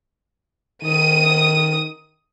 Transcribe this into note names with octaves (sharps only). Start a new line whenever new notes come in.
D#3 D#6 D#7